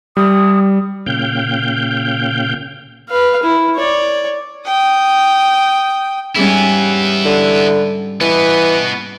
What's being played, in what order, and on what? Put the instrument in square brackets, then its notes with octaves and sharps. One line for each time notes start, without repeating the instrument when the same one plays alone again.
[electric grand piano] G3 [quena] D#6
[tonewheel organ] A#2 C#3 F5 G5 G6
[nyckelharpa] B4 F5
E4
C#5 D5
[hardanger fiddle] G5 D#6
[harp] G#2 G3 C#4 [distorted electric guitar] B3 E4
[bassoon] D3
[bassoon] E3 [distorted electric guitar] B3 D#5